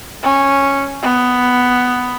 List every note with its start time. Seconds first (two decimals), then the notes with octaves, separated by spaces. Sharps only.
0.22 C#4
1.03 B3